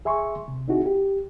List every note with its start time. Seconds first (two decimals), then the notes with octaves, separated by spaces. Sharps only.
0.05 G#4 E5 G#5 C6 C#6
0.48 C3
0.68 C4 D#4 E4 F#4 G#4
0.86 G4